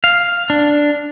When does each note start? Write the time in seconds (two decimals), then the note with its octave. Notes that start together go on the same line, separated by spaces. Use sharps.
0.04 F5
0.50 D4